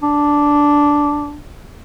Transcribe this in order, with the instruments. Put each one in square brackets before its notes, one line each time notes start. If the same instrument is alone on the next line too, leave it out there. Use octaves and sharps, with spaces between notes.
[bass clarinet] D4